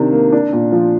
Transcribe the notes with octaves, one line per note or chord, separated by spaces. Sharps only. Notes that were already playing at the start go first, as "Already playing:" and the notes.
Already playing: C3 D#3 D4
A#3
D4
A#2
F3